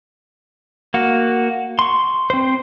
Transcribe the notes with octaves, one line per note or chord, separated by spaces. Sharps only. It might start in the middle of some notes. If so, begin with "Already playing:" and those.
A#3 F#4
C6 C#6
C4 C5